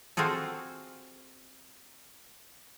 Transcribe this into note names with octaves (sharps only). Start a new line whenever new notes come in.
C4 F4 F#4 G#4 A4